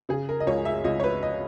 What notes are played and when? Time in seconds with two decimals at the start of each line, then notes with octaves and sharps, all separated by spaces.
0.09 C#3 G#4
0.29 A#4
0.40 D#5
0.47 C#2 C#5
0.65 E5
0.84 C#2 D#5
1.00 C#5
1.04 B4
1.23 D#5